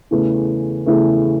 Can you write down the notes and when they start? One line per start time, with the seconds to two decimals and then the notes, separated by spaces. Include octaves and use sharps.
0.11 E2 C#3 E3 A3
0.86 E2 C#3 E3 A3